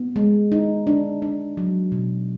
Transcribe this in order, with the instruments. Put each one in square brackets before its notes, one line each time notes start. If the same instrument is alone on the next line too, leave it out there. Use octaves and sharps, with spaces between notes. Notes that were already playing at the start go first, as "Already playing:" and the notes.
Already playing: [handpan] B3
G#3
D#4
D4
D4
F#3
B2